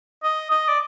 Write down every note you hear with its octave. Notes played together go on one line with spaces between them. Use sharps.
D#5
D#5
D5